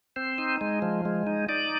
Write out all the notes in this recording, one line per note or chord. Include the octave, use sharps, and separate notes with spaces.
C4 C5
D#4
G#3
F3
G#3
D#4
D#4 D5